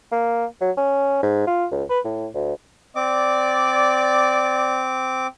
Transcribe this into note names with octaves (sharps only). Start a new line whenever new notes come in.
A#3
F#3
C#4
G#2
F4
C#2
B4
A2
D2
C4 D5 D6